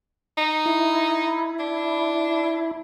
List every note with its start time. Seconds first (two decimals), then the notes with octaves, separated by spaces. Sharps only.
0.38 D#4
0.66 E4
1.59 D4